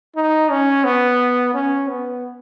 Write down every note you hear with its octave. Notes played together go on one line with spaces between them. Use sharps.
D#4
C#4
B3
C#4
B3